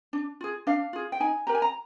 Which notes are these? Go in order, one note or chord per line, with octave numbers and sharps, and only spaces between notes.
D4
F4 G#4
D4 F5
F4 G#4
G5
D#4 G#5
G4 A#4 A#5
G#5
A#5